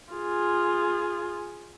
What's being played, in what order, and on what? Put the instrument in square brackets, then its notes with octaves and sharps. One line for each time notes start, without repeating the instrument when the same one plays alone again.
[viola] F4 G#4